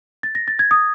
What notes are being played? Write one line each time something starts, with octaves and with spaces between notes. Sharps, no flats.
A6
A#6
A6
G#6
D#6